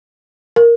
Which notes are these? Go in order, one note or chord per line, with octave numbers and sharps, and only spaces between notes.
A#4